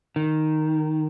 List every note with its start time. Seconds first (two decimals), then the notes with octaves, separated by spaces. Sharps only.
0.16 D#3